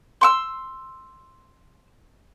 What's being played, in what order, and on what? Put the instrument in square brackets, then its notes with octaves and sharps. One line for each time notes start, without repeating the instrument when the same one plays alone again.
[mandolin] C6 C#6 E6